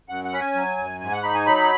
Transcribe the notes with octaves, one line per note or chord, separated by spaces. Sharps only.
F#2 F#5
F#5
C#4 B5
G#5
F#3
F#2
G#2 G#5
F#5
D#4 B5
G#5
F#3 B5